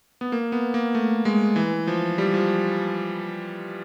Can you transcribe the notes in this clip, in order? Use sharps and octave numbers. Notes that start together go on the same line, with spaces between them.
B3
A#3
B3
A#3
A3
G#3
E3
F3
G3
F3